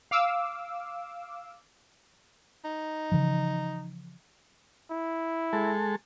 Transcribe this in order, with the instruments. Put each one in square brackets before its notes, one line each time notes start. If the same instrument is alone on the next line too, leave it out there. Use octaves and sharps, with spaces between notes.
[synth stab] F5 D6 E6
[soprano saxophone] D#4
[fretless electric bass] C#3 E3 F3
[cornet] E4
[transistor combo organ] G#3 A4